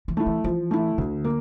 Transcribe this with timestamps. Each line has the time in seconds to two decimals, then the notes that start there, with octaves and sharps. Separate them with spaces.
0.08 E3
0.17 A3 E4
0.26 E3
0.44 E3 F3
0.71 A3 E4
0.98 D2 D3
1.25 A#3